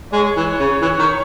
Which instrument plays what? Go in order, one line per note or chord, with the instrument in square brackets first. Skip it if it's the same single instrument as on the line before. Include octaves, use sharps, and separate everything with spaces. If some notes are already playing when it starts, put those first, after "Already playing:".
[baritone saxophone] G#3 [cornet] C#5
[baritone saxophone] E3
C#3
E3
D#3